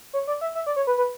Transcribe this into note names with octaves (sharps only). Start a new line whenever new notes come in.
C#5
D5
E5
E5
D5
C#5
B4
B4